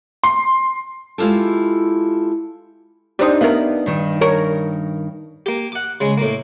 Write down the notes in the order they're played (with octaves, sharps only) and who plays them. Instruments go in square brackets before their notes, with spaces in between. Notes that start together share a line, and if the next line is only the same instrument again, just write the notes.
[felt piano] C6
[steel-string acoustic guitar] G#3 E4 F4 G4 A4
[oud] D4 D#4 [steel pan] G4 C5 D#6
[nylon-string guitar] B3 [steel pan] A#4 E5 F5
[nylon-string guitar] G2 D#3
[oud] A#4 [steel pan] C#5 C#6
[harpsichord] A#3 G4
F#5 D6
C#3 G#3
A2 A#3